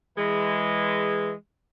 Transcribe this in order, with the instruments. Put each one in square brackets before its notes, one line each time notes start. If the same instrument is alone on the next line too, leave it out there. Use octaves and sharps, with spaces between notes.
[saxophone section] E3 G#3